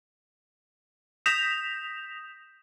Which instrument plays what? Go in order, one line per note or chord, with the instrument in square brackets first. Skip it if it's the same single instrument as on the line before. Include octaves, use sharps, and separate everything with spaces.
[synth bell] D#6 G6 A#6 B6 E7 F7